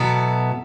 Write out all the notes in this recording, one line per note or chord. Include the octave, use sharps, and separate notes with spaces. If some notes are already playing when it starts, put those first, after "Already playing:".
Already playing: B2 F#3 B3 E4 A4